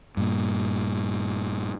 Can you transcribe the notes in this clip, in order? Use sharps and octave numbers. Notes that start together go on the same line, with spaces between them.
G2 A#2